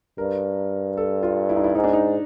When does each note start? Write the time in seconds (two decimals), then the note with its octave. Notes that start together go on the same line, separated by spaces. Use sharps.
0.18 G2 A#4
0.97 A4
1.23 F4
1.49 E4
1.56 D#4
1.64 E4
1.75 G#2 D#4
1.84 D4
1.93 D#4